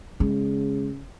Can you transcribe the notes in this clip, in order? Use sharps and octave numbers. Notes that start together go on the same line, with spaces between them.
C#3 G#3